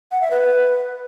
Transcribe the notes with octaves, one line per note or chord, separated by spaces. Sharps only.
F#5
E5
B4